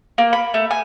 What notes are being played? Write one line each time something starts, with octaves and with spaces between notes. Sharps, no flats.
A#3
B5
A3
G#5